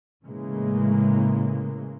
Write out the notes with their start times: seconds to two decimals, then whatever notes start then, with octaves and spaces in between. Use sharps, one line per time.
0.24 A2 C#3 E3 G#3 A#3